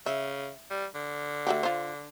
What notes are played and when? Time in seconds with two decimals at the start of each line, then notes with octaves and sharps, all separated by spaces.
0.06 C#3 E5
0.70 G3
0.95 D3
1.47 A3 F#4 G4
1.63 F4 C5